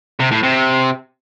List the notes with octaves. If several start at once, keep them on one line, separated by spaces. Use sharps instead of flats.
C3
A2
C3